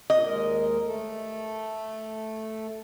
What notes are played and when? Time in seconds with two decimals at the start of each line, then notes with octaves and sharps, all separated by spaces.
0.10 A#2 D#5
0.25 D#2 G#3 A#4
0.87 A3 A4